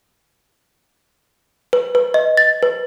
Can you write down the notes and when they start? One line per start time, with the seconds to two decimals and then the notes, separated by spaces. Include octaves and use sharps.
1.73 B4
1.95 B4
2.14 D#5
2.37 A6
2.63 B4